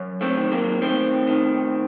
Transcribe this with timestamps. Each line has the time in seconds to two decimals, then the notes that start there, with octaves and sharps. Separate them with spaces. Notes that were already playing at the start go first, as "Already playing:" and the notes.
Already playing: F#2
0.21 A3 C4
0.37 D#3
0.52 F#3 A#3
0.81 D#3 A3 C4
1.27 D#3